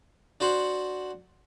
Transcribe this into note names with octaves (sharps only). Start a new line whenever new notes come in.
D4 F#4 C5 F#5